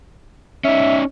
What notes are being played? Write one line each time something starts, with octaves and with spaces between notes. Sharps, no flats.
C#4 D#4 E5